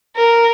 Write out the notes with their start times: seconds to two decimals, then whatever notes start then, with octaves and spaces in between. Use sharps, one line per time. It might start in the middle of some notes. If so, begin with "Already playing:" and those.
0.16 A#4